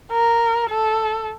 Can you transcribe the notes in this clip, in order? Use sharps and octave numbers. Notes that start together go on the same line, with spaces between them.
A#4
A4